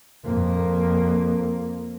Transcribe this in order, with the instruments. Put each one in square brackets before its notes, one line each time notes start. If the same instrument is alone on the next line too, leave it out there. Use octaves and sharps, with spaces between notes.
[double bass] F2 A#3